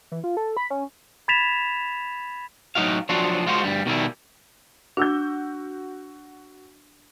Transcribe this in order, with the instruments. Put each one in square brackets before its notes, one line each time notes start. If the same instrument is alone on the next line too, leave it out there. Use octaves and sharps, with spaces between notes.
[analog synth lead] E3
F4
A4
B5
C#4
[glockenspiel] B5 G#6 A6 B6 E7 F7
[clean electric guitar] A2 F#3 A#3 D#4 F#4 F5
F3 F#3 D4 F4 F#4
G#3 F4 F#4 C5
D2 G2 G3
B2 D#3 G3 E4
[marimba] D4 [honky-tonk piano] F#4 E6 G6